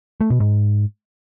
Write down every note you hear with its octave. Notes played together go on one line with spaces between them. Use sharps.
A3
B2
G#2